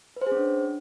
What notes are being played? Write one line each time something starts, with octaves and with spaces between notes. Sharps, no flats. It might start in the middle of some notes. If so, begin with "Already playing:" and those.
B4
C5
G#4
C#4
D4